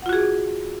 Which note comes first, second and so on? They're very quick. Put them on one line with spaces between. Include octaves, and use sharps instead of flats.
F#5 F4 F#4 G#4